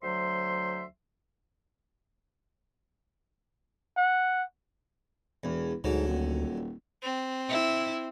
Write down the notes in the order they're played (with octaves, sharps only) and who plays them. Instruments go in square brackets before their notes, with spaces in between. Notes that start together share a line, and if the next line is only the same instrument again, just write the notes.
[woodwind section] D2 F#3 C5 E5 C6
[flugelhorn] F#5
[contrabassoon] E1 [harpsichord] E2
[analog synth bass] D2 [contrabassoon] G#2 [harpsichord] D3 F#3
[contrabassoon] D#1
[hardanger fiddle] C4
[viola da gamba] E4